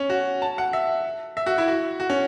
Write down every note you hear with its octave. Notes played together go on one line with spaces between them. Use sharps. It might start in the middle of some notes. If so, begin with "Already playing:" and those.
Already playing: C#4
F#4
A5
F#5
E5
E5
F#4
E4
F#4
F#4
C#4